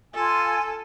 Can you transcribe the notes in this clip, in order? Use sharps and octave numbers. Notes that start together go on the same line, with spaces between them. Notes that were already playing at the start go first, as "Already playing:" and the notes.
F4 A4 G#5